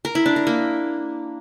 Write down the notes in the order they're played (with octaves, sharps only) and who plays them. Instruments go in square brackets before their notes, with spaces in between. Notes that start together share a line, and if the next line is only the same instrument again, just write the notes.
[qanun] A#4
E4
D4
A#4
A#3